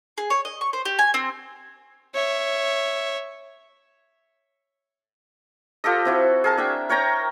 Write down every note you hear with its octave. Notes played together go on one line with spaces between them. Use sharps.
G#4
C#5
D#5
C#6
C5
G4
G#5
C4
C#5 E5
F4 G4 A4 D#5
C4 E4 F#4
G#4 A#4 A5
D4 E5 G5
A#4 C#5 G5 A#5